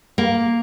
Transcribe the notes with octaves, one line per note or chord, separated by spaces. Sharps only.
A#3